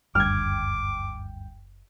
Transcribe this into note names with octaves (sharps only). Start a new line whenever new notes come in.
F#1 D2 G2 G5 D6 F6 G#6